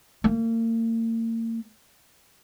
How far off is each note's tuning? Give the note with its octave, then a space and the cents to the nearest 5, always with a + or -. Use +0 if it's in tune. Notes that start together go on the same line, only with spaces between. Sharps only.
A#3 -40